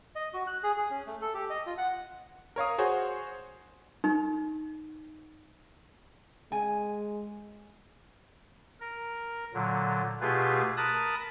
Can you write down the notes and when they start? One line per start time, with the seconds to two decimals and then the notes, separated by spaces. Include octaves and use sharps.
0.16 D#5
0.34 F#4
0.47 F#6
0.63 G#4
0.77 G#4
0.91 C#4
1.07 A3
1.21 A4
1.34 G4
1.50 D#5
1.66 F4
1.78 F#5
2.56 A#4 C#5 F5 D#6
2.78 F#4 G#4 C5 C#5
4.04 D#4
6.52 G#3 G#5
8.80 A#4
9.54 A#2 D3 F#3
10.21 B2 A3 F4 G4 G#4 B4
10.77 A#4 A5 B5 D#6 F#6